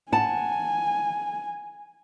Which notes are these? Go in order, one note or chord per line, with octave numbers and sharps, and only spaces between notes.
F#5 G#5 A5